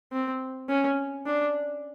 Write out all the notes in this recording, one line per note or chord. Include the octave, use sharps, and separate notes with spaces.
C4
C#4
D4